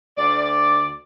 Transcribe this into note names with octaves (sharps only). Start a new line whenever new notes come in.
D2 D5